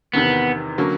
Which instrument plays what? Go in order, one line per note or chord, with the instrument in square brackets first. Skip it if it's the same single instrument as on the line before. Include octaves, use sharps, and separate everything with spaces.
[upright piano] E2 C3 D#3 [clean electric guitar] B3
[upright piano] D3 F#3 A#3 C#4